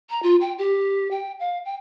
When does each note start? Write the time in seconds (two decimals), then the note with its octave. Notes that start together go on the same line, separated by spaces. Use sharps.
0.10 A#5
0.23 F4
0.41 G5
0.59 G4
1.11 G5
1.40 F5
1.65 G5